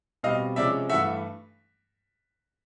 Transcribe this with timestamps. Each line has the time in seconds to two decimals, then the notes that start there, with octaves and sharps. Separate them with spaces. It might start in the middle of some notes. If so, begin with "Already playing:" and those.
0.23 B2 G3 C4 D#5 F5
0.56 C3 F3 G#3 C#4 D5 E5
0.89 G2 E3 A3 E5 F#5